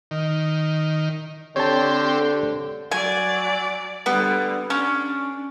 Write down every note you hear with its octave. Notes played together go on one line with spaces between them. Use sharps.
D#3
D3 C4 G4 C#5 A5
F#3 D5 G#5
D3 G3 B3
C#4 D4